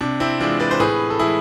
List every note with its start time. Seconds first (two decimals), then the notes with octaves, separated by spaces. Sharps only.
0.01 C3 D4
0.20 C4 E4
0.40 E3 G#3 D4 F4
0.60 B4 D5
0.71 C5
0.80 A2 G#4 B4
1.10 A4
1.19 E3 G#3 E4 G#4